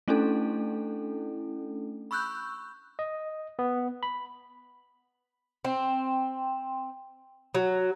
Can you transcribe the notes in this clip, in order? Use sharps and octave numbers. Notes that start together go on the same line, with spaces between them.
A3 C#4 D4 E4 A4
B5 C#6 E6 F#6 G6
D#5
B3
B5
C4
F#3